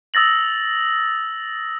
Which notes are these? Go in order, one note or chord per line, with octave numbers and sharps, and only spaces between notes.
D#6 E6 A6 A#6 F#7